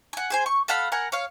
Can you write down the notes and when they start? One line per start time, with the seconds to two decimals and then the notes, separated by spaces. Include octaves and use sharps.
0.13 F#5 G#5
0.30 G#4 C5 G#5
0.46 C#6
0.68 A4 F5 F#5 B5
0.92 A#4 F#5 G#5
1.12 C#5 F5